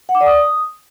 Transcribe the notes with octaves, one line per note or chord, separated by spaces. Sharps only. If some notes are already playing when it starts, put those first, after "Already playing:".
F#5
D6
D5
D#6